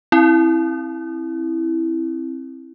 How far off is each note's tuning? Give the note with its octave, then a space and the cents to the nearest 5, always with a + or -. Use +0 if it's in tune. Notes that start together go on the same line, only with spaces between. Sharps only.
C4 +25 E4 +0